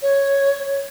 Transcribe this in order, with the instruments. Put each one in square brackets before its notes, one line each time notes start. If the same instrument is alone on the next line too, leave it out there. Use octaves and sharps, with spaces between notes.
[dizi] C#5